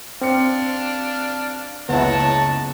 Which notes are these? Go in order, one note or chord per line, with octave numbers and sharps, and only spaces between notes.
C4 D4 F5 D6 C#7
F#1 C#2 B3 E4 C#5 F#5 A5 A#5